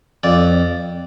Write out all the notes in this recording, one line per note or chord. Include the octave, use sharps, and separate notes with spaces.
F2 D5